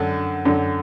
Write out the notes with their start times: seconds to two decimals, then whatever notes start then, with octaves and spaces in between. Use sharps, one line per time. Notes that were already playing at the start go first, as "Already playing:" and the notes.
Already playing: F#2 D3 D4
0.45 F#2 D3